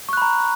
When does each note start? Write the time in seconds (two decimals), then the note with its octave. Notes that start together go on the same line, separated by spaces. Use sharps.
0.09 C#6
0.13 F#6
0.17 B5
0.22 A#5